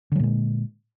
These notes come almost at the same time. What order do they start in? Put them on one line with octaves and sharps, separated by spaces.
D3 F#3 A#2 G#3